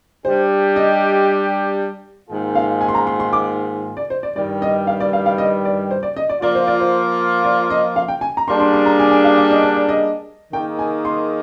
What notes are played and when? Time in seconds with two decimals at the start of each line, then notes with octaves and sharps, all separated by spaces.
0.24 G3 D4 G4 C5
0.76 D#5
2.29 G#2 D#3 A#3 F4 G#4
2.55 F5
2.81 G#5
2.88 C6
2.95 A#5
3.07 C6
3.20 C6
3.33 D6
3.97 D5
4.10 C5
4.23 D5
4.36 G2 D#3 G3 D5
4.62 D#5
4.87 F5
5.00 D5
5.13 F5
5.26 F5
5.38 D#5
5.65 D5
5.91 C5
6.03 D5
6.16 D#5
6.29 D5
6.42 F3 A#3 F4 D5
6.55 C5
6.67 D5
6.80 C5
7.44 D5
7.70 D#5
7.96 F5
8.08 G5
8.21 G#5
8.37 A#5
8.48 G3 A#3 D4 G#4 C6
8.60 C6
8.74 C6
8.86 A#5
9.00 G#5
9.11 G#5
9.24 F5
9.38 D5
9.51 D#5
9.63 D5
9.76 D5
9.89 D#5
10.53 D#3 A#3 D#4 G#4 G5
10.79 G#5
11.05 C6